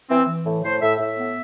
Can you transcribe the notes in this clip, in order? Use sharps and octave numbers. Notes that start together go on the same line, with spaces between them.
E3 C4
E3
A2
A2 C5
A2 E5
A2 E5
B3